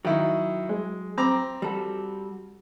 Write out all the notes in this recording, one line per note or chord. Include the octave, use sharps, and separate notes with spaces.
D#3 F#3 E4
G#3
C4 A#5 D6
G3 F#4 A4